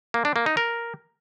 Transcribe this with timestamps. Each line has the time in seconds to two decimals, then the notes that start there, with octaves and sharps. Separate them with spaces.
0.14 A#3
0.25 D4
0.36 A#3
0.46 D#4
0.57 A#4